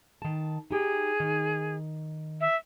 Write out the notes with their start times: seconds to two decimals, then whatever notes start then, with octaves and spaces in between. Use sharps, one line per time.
0.22 D#3 A5
0.71 D#4 G4 G#4
1.20 D#3
2.41 E5